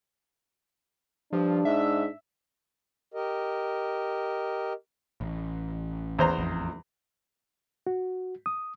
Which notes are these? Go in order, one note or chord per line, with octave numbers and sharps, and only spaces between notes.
G2 F3 D4
G#2 E5
G4 A#4 D#5
A1
E2 C5 A#5
A1 F2
F#4
D#6